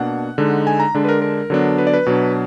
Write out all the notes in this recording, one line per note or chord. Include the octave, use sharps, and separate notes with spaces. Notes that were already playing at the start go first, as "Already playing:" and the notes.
Already playing: B2 A#3 D4 F#5
D3 G#3 D#4
G#5
A#5
D3 G#3 D4
B4
A#4
A#4
D3 F#3 B3 D4
B4
D5
B4
B2 F#3 D4